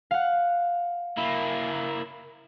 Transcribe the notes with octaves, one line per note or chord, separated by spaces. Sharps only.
F5 F#5
A#3 E4